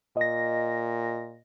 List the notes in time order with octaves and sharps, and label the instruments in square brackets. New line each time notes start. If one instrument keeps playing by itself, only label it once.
[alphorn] A#2 [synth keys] D#5 A#6